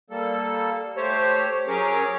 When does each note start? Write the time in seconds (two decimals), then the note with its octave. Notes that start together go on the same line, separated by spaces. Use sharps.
0.10 G3 A#3 A4
0.97 A3 G4 C5 C#5
1.68 F#3 C#4 G#4 A#4 C#5 D6